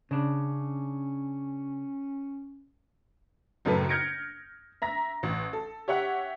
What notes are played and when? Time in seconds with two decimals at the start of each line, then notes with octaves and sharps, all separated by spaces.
0.11 C#3 C#4 D4
3.65 F#1 F#2 A2 A4 B4
3.89 F6 G6 G#6 A#6 C#7 D7
4.82 E5 A#5 A#6
5.23 A1
5.53 A4
5.88 G4 C#5 E5 F#5